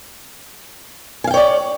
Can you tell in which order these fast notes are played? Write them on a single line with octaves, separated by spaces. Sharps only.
G#5 F5 G5 C#5 D5